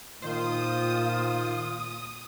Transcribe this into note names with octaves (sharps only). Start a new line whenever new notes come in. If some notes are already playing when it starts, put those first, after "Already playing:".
A#2 D#3 F4 C5 D#6